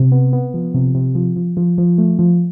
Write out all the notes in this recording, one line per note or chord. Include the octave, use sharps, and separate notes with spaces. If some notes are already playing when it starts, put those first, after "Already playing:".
Already playing: C3
B3
B3
F3
C3
C3
F3
F3
F3
F3
A3
F3